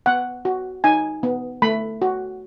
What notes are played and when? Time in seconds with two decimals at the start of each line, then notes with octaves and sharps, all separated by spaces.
0.06 B3 F#5
0.45 F#4
0.84 D#4 G#5
1.23 B3
1.62 A3 B5
2.02 F#4